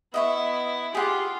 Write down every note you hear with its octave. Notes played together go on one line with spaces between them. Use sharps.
B3 E4 D#5 E5 C#6
F4 G4 G#4 F#5